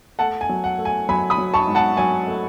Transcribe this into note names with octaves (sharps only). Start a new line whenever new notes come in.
A3 F#5 A5
G#5
F#3
F#5
A3
G#5
F#3 G#5 B5
B5 D#6
F#3
A5 C#6
G#2
F#5 A5
F#3 G#5
A3